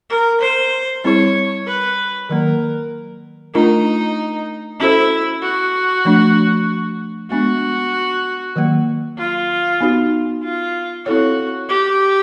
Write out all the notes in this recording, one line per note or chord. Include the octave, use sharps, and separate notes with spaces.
A#4
C5
G3 C4 E4 G#4 C#5
B4
D#3 F#3 A#3 A#4
A3 D4 D#4 F4 A#4
C#4 E4 F#4 A4 C5
F#4
F3 A3 D4
G#3 B3 D4 F#4
D#3 F#3 A#3
F4
B3 D#4 F#4
F4
C4 E4 F#4 A4 C#5
G4